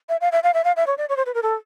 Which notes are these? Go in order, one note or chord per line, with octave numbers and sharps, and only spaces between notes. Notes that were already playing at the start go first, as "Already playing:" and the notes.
E5
F5
E5
F5
E5
F5
E5
C#5
D5
C#5
C5
B4
A#4
A4